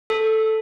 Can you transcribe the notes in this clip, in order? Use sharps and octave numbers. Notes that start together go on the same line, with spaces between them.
A4